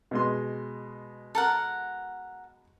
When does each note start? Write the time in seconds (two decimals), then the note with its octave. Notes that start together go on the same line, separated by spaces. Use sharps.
0.11 B2 G#3 C6
1.35 A4 A#4 F#5